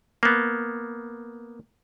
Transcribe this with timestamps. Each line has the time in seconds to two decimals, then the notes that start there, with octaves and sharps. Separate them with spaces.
0.23 A#3 B3